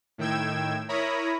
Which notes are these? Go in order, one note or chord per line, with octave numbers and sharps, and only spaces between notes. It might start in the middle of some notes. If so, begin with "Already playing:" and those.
A2 D#3 G5 E6 G#6
E4 A#4 C#5 A#5 B5 D#6